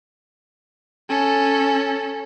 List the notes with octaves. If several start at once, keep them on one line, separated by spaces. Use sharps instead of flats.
C#4 A4